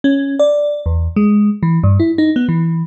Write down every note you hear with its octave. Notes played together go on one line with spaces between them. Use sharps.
C#4
D5
E2
G#3
E3
G2
E4
D#4
B3
E3